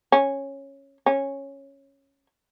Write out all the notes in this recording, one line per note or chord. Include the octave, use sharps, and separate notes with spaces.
C#4
C#4